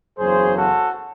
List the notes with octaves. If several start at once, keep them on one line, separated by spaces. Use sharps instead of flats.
F#1 E2 C#3 F#3 G#4 C5
F#4 A4